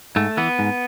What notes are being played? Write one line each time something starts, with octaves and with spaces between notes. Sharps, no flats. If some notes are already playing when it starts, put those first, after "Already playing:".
G#2 A3
E3 B3
G#2